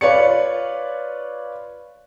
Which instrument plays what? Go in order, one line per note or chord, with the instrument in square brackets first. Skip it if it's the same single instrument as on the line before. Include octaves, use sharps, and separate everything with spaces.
[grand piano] F4 B4 C#5 D5 C#7